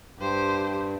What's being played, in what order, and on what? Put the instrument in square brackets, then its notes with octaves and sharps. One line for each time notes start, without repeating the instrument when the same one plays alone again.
[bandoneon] G2 [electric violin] G4 C5